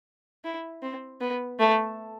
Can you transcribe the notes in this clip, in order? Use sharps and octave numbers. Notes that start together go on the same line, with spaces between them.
E4
C4
B3
A3